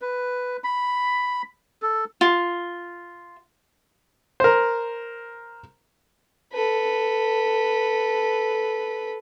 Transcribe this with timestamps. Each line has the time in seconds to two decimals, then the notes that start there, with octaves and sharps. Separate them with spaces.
0.02 B4
0.64 B5
1.82 A4
2.21 F4
4.40 A#4 C5
6.53 A4 B4